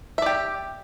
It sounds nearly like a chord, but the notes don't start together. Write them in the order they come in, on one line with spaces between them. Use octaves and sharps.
E5 D5 G4